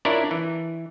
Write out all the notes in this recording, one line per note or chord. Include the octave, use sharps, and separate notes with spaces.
D4 E4 F4 A#4 C#5 D5
E3